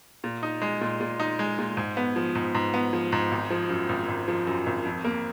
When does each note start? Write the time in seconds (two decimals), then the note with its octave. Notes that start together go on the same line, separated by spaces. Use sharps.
0.24 A#2
0.43 D#4
0.62 G#3
0.81 A#2
1.00 A#2
1.20 D#4
1.39 G#3
1.58 A#2
1.77 G#2
1.97 B3
2.16 F3
2.35 G#2
2.55 G#2
2.74 B3
2.93 F3
3.12 G#2
3.31 G#1
3.50 F3
3.70 F#2
3.89 G#1
4.09 G#1
4.28 F3
4.47 F#2
4.66 G#1
4.85 F2
5.05 A#3